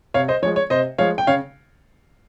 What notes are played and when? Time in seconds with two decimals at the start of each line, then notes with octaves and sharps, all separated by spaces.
0.14 C3 C#5 F5
0.28 C5 D#5
0.42 F3 G#3 C#5
0.56 C#5
0.70 C3 C5 D#5
0.98 F3 G#3 C#5 F5
1.18 G5
1.27 C#3 C#5 F5